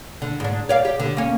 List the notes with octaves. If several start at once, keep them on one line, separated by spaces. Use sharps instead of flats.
D3
G#2 D4
C#5 D5 F5
G4
D3
A#3 C#4